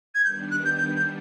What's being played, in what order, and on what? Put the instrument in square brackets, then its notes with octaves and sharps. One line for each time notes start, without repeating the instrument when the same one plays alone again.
[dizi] G#6
[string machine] D#3 G3 B3 D4 [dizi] G6
[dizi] F#6
G6
G6
G6